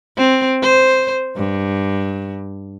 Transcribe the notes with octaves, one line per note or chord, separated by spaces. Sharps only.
C4
C5
G2